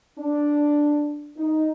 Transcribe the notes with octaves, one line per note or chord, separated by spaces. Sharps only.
D4
D#4